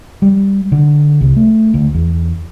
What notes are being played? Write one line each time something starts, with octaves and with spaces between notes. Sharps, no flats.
G3
D3
C2
A3
D2
E2